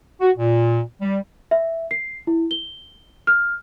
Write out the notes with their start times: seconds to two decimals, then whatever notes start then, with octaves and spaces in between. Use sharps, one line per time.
0.21 F#4
0.37 A#2
1.01 G3
1.51 E5
1.91 C7
2.27 E4
2.51 G7
3.27 F6